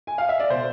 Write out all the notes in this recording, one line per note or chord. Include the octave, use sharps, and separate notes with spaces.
G#5
F5
E5
D5
B2 C5